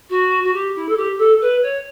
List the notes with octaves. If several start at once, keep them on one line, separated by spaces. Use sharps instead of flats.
F#4
F#4
G4
E4
A4
G4
A4
B4
C#5